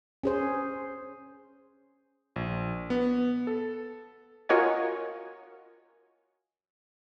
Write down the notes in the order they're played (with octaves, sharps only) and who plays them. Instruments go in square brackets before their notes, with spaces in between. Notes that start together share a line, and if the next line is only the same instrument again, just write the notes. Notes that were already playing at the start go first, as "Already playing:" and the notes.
[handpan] C#4 G#4 C5
[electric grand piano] A#1
B3
A4
[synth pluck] F4 F#4 A#4 C#5 D#5 G#5